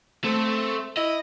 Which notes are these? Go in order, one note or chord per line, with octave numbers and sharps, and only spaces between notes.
A3 C4
E4 D#5